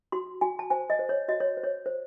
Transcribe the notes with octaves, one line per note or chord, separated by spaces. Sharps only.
F#4 C6
F#4 G#5
A5
C5 G#5
D#5
C5
C#5
F#4 D#5
C#5
C5
C#5
C5